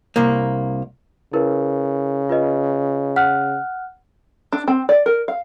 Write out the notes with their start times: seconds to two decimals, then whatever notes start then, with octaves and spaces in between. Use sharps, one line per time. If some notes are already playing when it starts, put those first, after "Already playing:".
0.16 C2 A#3
1.33 C#3 E4 A#4 B4
2.29 F4 B4 D#5
3.16 F#5 F6 F#6
4.53 D4
4.68 C4
4.89 D5
5.06 A#4
5.28 F5